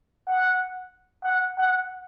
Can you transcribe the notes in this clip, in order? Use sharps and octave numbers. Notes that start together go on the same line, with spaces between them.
F#5
F#5
F#5